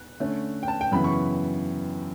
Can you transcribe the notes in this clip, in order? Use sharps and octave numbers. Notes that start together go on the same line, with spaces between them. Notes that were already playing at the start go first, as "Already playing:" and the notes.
Already playing: F#6
D3 A3 C#4
G5
A5
G5
F#2 C#3 E3 B3 B5
C#6